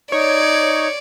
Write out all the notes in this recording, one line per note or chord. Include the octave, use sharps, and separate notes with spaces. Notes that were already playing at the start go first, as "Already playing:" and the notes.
D#4 C#5 D5